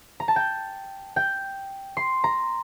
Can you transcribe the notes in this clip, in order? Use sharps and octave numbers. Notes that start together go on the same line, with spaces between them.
A#5
A5
G5
G5
C6
A#5